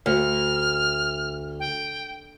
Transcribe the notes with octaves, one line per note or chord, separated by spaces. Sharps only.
D2 F6
G5